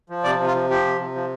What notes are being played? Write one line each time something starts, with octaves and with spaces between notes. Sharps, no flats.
F3
C3 D5
C3
F4
F3
F3 G4
C3
C3
F3